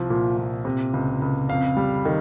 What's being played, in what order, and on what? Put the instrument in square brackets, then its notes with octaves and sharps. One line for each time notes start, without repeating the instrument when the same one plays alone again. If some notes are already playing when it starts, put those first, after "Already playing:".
Already playing: [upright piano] C2 F3
A#2
A#2
C3
C#2
C#2
F2 F5
G3
D#3